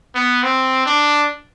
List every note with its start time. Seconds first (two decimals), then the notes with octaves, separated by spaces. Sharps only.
0.15 B3
0.43 C4
0.86 D4